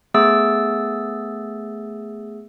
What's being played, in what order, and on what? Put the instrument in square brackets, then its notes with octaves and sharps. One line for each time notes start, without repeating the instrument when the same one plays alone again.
[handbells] A3 B3 G#4 E6 A6